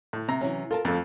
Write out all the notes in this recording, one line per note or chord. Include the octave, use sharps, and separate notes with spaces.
A2
C3 A#5
E3 F#3 C#4
F4 A4 A#4 A5
F2 F3 A3